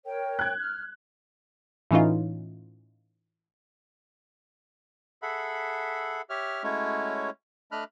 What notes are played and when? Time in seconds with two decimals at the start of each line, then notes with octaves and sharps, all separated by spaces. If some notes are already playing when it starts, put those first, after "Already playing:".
0.06 A#4 C#5 G5
0.39 F#6 G#6
0.60 F6
1.91 A2 E3 C#4 D#4 F4
5.22 G#4 A4 E5 F#5 B5
6.30 G4 C#5 E5 F6
6.63 G#3 A3 C#4 E4 F#4 C#5
7.72 A3 D4 D#5 B5 F6 F#6